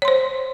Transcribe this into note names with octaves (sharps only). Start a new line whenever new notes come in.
C5 C#5 C6